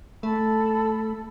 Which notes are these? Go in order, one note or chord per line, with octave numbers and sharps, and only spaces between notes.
A3 A4 B5 E6